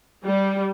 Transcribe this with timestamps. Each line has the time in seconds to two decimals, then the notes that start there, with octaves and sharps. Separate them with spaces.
0.25 G3